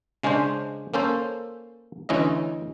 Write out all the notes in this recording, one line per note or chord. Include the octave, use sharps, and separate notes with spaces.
C#3 G#3 C#4 D4 C5
A#3 C#4 A4 C5
D2 E3 C#4 E4 D#5